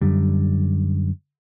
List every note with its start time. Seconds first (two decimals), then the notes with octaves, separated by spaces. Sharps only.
0.02 F#2 D3 G3